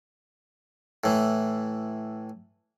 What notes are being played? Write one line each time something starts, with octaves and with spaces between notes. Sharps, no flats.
A2 E3